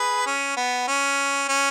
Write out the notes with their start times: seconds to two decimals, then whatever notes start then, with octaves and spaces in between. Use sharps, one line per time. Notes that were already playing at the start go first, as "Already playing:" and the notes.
Already playing: G#4 B4
0.27 C#4
0.57 B3
0.88 C#4
1.49 C#4